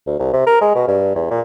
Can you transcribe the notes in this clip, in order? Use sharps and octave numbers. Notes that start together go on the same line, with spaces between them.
D2
C2
C3
A#4
G#3
B2
G2
E2
A#2